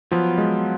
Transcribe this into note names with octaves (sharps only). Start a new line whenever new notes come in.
F3 F#3 B3 F4
G#3